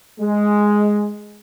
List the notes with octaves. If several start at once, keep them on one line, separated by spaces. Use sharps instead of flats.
G#3